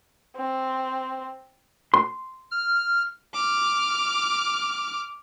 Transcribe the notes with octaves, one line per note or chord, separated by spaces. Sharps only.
C4
C6
F6
D6 F6